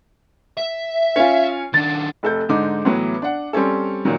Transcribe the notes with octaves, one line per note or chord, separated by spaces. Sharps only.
E5
C#4 F4
D#3 D4 A6
F1 A4 G6
G#2 D3 D#4 D6
A2 E3 F#3 B3
D4 F#5
G3 C4 C#4 A4
A#2 D#3 F#3